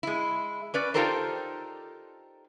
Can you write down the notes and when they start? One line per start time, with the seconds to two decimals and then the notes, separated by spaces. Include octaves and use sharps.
0.03 G#3 E4
0.74 C#4 B4 D5
0.94 D#4 F4 G4 A4 A#4 C5